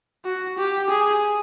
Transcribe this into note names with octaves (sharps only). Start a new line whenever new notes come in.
F#4
G4
G#4